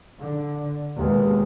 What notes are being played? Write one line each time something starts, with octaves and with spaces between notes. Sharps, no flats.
D3
D#2 B2 G#3